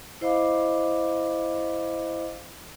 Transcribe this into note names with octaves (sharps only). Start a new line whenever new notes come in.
E4 C5 D#5 F5 B5 D6